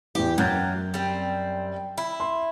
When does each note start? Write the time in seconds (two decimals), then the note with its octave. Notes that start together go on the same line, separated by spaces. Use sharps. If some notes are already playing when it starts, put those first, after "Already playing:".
0.15 E2 E3 G4
0.38 F#2 F#3 A#3 G6 A6
0.94 G3 C4
1.98 E4
2.20 C6